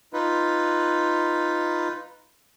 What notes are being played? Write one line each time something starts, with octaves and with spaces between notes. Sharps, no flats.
D#4 F4 B4